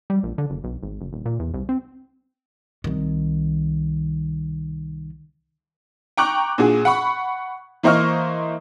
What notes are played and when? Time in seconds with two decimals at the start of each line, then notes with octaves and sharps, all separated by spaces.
0.10 G3
0.23 A#1
0.38 D3
0.50 F#1
0.64 B1
0.83 G#1
1.01 F#1
1.13 D#1
1.26 A#2
1.40 E2
1.54 C2
1.69 C4
2.84 C2 D#3
6.17 G5 A#5 C#6 D6 F#6
6.58 A#2 D4 F#4 G#4
6.85 F#5 B5 C#6
7.83 E3 A#3 C5 D#5 C#6 F6